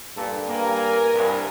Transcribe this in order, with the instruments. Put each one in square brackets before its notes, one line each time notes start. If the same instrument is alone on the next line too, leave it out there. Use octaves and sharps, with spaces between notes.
[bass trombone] G2 [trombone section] A#2 A#3 A4
[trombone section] A#3 [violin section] A#4 G#5
[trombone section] C2 [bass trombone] G2